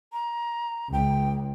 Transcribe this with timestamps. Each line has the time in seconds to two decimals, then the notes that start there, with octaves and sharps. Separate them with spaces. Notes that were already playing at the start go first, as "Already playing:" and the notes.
0.13 A#5
0.93 C#2 G5